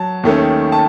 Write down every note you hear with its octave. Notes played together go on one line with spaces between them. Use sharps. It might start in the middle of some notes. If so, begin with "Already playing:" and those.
Already playing: F#3 A5
D#2 D#3 A3 C#4
A5